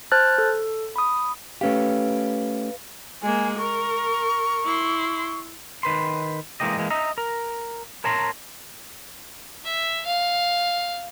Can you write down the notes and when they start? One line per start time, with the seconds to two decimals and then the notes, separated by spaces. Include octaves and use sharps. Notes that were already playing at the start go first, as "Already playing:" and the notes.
0.12 C5 A5 F6 F#6 A6
0.38 A4
0.96 B5 D#6
1.61 A3 C#4 G4 B4 F5
3.23 G#3 A#3 G#5
3.58 A#4 C#6
4.65 E4 C6
5.83 D#3 B4 C6
6.60 E3 G#3 A#3 G4 D#5
6.77 E3 G#3 A#3
6.90 D#5 E5 A#5
7.18 A#4
8.04 A#4 C#5 A5 A#5 C6
9.65 E5
10.06 F5